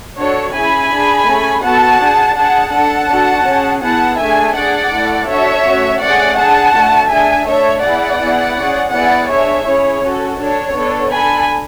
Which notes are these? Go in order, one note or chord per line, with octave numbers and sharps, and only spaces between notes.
D4 F#4 A4 C#5
C#4 E4 G#4 G#5 B5
D4 G#4
A3 C#4 G#4
B3 F#4 A4 F#5 A5
D4 G#4
D4 G#4 F#5 A5
D4 A4 F#5 A5
D4 F#4 A4
C#4 G#4
B3 E4 G#4 F#5 A5
A3 D4 G#4 E5 G#5
D4 G#4 D5 F#5
A3 E4 A4
D4 F#4 A4 C#5 E5
A3 C#4 F#4
A3 C#4 G#4 D5 F#5
D4 G#4 F#5 A5
A3 D4 F#4
D4 G#4 E5 G#5
A3 D4 A4 C#5 E5
B3 E4 G#4 D5 F#5
B3 E4 G#4
C#4 G#4
B3 E4 G#4 D5 F#5
D4 G#4 C#5 E5
C#4 E4 G#4 C#5
C#4 F#4 A4
D4 A4 C#5
B3 D4 A4
D4 A4 G#5 B5